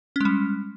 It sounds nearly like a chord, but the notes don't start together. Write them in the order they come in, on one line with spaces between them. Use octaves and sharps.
C#4 G#3 G3